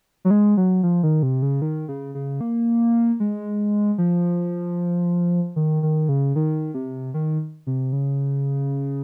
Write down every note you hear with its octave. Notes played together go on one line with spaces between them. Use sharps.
F#3
G#3
F#3
F3
D#3
C3
C#3
D#3
C#3
C#3
A#3
G#3
F3
D#3
D#3
C#3
D#3
C3
D#3
C3
C#3